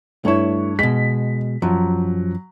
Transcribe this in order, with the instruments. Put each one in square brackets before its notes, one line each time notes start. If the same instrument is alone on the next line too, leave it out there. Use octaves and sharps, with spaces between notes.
[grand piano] G2 C#5 C#6 [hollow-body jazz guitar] A3 E4
[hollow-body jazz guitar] B2 G#3 [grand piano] B6
[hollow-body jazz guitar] F#2 F3 [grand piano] F#3